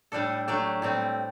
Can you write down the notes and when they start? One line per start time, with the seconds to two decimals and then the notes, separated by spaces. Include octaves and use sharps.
0.12 A2 G3 D4 A4
0.48 F#3 A3 D4 G4
0.82 A2 G3 C4